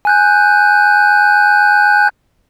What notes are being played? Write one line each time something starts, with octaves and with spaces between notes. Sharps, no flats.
G#5 F#6 G6